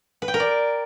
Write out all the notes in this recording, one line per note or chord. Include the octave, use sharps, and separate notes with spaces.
B4
G5
A#4
D5